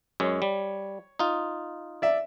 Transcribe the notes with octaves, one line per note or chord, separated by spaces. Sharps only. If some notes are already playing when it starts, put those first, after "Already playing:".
F#2 G#3 C#5
G3
D#4 F4
D5 E5